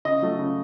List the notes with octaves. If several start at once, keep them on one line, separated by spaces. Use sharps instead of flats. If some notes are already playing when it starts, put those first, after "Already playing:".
C#3 D#5
F#3 A3
C#3